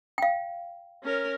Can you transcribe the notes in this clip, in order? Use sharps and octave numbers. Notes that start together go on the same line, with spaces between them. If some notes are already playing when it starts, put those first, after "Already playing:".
F5 G5
C#4 A#4